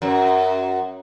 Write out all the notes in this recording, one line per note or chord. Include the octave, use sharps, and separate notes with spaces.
F#2